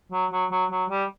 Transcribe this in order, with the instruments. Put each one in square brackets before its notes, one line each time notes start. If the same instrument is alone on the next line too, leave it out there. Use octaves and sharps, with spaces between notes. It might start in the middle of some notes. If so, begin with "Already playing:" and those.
[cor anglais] F#3
F#3
F#3
F#3
G3